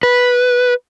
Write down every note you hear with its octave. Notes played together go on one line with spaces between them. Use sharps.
B4